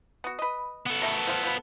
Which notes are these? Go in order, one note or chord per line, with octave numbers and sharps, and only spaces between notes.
B3 F#4
B4 D#5
B3 A4
B2 A3 A#4
F3 F4
F3 B4